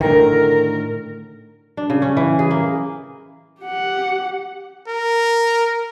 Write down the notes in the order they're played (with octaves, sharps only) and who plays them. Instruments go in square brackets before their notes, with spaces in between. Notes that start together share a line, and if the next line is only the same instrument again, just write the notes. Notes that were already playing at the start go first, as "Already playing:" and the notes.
[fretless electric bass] A2 D3 D#3 [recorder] A#4
[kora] D4
C#3
C#4
E3
G#4
A#3
[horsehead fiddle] G4 F#5
[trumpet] A#4